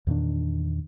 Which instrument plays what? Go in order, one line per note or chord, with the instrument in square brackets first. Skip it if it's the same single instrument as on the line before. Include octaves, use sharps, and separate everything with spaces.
[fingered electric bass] E2 A#2 D#3 D4